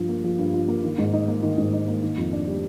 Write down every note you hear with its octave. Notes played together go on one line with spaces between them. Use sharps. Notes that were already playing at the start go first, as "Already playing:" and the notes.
Already playing: G2 F3 F4
A#3
F3
G2
F4
A#3
D#3
G#2
D#4
A#3
D#3
G#2
D#4
A#3
D#3
F2
D4
G3